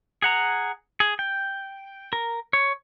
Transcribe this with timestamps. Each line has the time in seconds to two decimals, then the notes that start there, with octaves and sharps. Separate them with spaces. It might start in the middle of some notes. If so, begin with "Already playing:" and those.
0.22 G#4 F#5 A#5
1.00 G#4
1.19 G5
2.13 A#4
2.53 C#5